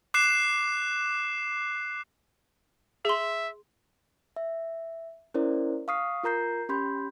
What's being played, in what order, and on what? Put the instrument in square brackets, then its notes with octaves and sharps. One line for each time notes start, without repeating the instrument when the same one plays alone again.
[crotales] D6 F#6 C7 E7
[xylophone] G#4 C6 [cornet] E5
[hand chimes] E5
C#4 E4 A#4 C5 D5
F5 C#6 D#6 F6 C7
F4 A#4 A#5 G6 C7
C#4 G4 B5 C6 G6